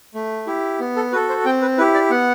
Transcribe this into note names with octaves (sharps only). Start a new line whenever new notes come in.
A3
E4 G4
B3
A4
F#4 A4 B4
C5
C4 G5
B4
E4 G4 B4
D5
B3 F#5